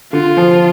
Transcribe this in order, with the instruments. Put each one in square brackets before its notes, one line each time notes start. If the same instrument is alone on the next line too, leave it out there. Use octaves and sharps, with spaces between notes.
[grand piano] D3 [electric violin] F4
[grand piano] F3